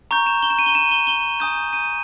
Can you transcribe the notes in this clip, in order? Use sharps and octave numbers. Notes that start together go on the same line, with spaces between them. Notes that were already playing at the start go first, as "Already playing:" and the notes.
A#5 C#6 G6
E7
G7
E7
D#7
G7
E7
G7
G7
G#5 D#6 G6
D#7